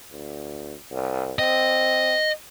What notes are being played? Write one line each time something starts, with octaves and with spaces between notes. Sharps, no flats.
D2
C2
C4 D#5